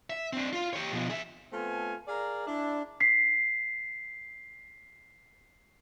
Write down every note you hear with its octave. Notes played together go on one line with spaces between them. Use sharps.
E5
C4 D4
F4
G4 C#5
B2 F3
G#4 E5
A3 B3 C4 F4 A4 G#5
G#4 A#4 D5 F5 A#5
D4 E4
B6 C7